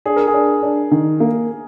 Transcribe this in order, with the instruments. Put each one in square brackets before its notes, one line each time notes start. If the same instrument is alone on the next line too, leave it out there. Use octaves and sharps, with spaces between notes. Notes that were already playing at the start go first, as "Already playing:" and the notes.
[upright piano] D4 [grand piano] G#4
[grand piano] A#4
G#4
[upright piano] D4
D4
D#3
A#3